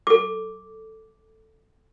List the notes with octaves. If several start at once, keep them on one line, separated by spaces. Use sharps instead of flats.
A4 D6